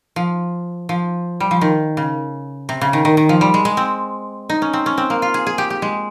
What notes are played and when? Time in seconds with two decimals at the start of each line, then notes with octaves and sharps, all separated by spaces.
0.16 F3
0.89 F3
1.40 G3
1.51 F3
1.61 D#3
1.97 C#3
2.69 C3
2.81 C#3
2.93 D#3
3.05 D#3
3.17 D#3
3.29 F3
3.41 G3
3.54 G#3
3.65 G#3
3.77 C4
4.49 D#4
4.62 C#4
4.73 C4
4.86 C#4
4.97 C4
5.10 A#3
5.22 F4
5.34 G#4
5.47 G#4
5.58 G4
5.70 G4
5.82 G#3